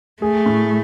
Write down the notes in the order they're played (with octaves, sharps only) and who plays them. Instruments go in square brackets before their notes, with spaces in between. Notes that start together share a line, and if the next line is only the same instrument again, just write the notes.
[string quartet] A3 [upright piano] G#4
[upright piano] A2